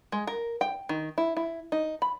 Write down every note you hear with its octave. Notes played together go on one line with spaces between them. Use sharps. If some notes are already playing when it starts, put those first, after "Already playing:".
G#3
A#4
G5
D#3
E4
E4
D#4
B5